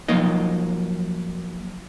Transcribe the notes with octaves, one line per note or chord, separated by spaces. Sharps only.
F3 F#3 A#3 D#4 D#5